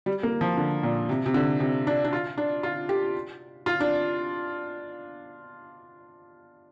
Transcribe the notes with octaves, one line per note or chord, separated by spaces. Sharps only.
G3
A#3
F3
D3
A#2
C3
C3
D3
C3
D4
D4
F4
D4
F4
G4
F4
D4